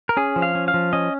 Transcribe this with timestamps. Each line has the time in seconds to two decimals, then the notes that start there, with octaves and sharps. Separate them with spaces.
0.09 A#4
0.17 C#4 G#4
0.36 F3
0.42 F5
0.55 C#4
0.68 F5
0.74 F3
0.93 C#4 D#5